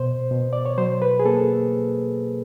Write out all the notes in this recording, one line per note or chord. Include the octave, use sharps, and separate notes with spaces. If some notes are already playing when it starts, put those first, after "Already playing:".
Already playing: B2 C5
B2
D5
C#5
F#3 C5
B4
G#4
A#3 A4